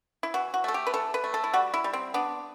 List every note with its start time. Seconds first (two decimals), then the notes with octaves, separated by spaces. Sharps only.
0.23 E4
0.34 E3 F#4
0.54 F#4
0.64 A3 A4
0.74 G4
0.87 B4
0.94 E3 A4
1.14 B4
1.24 A3
1.34 A4
1.44 E4
1.53 G3 F#4
1.74 E4
1.84 G3
1.93 C4
2.14 B3 D4